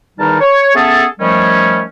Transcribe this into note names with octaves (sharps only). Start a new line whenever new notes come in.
E2 D#3 G3 D#4 A5 F6
C#5
A3 B3 C#4 G#4 A4
D#3 F3 G3 A3 C#4